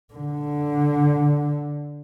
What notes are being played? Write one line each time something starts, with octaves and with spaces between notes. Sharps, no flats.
D3